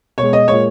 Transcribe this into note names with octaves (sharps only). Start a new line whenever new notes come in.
B2 G#3 C#5
D#5
A#2 G#3 C#5